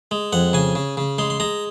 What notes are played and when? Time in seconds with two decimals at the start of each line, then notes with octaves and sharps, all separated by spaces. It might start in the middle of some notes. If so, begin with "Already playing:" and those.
0.11 G#3
0.33 F2 F#5
0.53 C#3 G#5
0.75 C#3
0.97 C#3
1.18 G#3 C6
1.30 C6
1.40 G#3 A#5